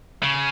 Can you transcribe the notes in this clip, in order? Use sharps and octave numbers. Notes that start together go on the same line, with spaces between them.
C#3